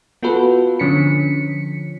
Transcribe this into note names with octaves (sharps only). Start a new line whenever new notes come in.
B3 F4 F#4 A4 B4
D3 F3 C#4 B6 C#7